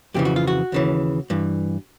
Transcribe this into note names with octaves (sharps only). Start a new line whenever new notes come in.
F2 C#3 E3 G4
F#4
F4
F#4
D#2 C#3 E3
G2 E3